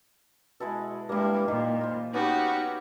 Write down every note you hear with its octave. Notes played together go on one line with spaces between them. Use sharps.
B2 G#3 E4 A4
G2 G3 G#3 A#3 E4
A#2 G3 D#4
F4 C5
B3 C#4 D#4 F#4 G4 D5 B5